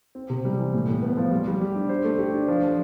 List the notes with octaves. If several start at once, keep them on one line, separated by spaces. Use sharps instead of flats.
C4
C3
G3
E3
A2
A2
B3
F3
G3
G3
G4
D4
C5
A3
G4
D4
F3
F3